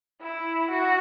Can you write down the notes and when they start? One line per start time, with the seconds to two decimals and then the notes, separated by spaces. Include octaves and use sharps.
0.21 E4
0.70 F#4